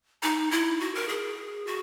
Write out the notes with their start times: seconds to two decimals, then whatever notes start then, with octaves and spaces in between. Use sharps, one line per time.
0.23 D#4
0.51 E4
0.80 F#4
0.95 A#4
1.08 G#4
1.67 F#4